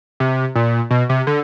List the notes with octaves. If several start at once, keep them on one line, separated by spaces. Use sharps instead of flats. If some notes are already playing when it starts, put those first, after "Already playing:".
C3
A#2
B2
C3
D3